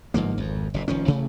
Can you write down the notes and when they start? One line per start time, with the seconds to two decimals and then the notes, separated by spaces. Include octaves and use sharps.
0.14 G1 G#2 F3 A#3
0.38 G#1 F2
0.74 F#1 A#2
0.88 F1 D#3 F3 C#4
1.06 A1 C3 A3